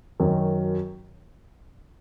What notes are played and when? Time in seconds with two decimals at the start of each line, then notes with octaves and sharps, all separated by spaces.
0.20 F#2 D#3 F#3